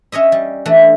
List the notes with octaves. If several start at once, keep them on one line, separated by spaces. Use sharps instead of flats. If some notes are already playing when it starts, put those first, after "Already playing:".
C#4 C#5 D#5 E5
G3
E3 A3 D4